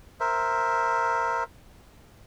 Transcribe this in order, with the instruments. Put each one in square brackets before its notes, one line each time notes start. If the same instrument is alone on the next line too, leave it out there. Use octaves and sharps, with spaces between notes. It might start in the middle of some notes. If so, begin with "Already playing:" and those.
[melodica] A#4 C5 E5